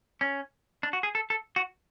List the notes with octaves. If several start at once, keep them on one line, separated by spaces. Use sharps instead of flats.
C#4
D4
F#4
G#4
A4
A4
F#4